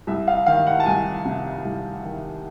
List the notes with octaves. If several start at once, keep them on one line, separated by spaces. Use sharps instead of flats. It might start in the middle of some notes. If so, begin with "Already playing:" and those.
C2 E5
F5
D#3 F5
F#5
A5
C2 G#5
C3
C2
D#3